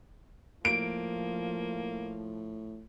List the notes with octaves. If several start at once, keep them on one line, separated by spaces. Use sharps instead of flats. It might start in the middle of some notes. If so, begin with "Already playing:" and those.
A2 F3 A#3 D7